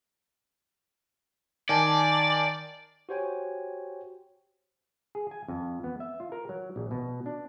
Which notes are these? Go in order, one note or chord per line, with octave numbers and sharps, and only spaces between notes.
D#3 D5 G#5 A5
F#4 G4 C5 C#5 G5 G#5
G#4
G#5
F2
B3
E5
F4
A#4
F#3
A#1
B2
D4